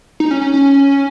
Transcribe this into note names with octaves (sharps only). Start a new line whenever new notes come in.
D#4
C#4
C#4
C#4